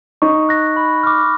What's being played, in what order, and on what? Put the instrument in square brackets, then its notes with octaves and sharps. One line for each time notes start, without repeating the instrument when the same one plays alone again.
[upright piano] D#4 [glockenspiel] C#6
[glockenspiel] F#6 A#6
B5
D6 F6